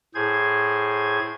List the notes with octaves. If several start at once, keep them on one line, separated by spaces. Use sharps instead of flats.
A2 G#4 C5 G#6